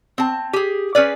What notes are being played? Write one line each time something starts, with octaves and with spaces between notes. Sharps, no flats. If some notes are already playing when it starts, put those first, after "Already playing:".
C4 A5
G4 G#4
C#4 G#4 B4 D5